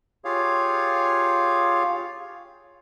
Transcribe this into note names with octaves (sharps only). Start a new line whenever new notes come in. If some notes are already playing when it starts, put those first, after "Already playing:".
F4 G4 G#4 C#5 F5